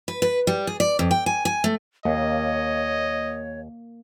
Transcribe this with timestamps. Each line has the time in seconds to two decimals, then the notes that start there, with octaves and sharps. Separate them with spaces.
0.08 B4
0.22 B4
0.47 G3
0.67 G#4
0.80 D5
0.99 F2
1.11 G5
1.26 G#5
1.45 G#5
1.64 A3
2.05 D#2 A#3 C#5 D#5